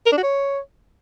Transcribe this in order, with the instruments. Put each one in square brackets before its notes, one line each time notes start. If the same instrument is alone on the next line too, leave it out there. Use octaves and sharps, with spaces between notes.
[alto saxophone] A#4
D4
F#4
C#5